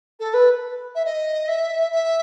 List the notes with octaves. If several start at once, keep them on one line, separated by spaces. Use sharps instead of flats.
A4
B4
E5
D#5
E5
E5